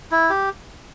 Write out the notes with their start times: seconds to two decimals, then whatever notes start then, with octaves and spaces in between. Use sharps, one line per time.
0.12 E4
0.30 G4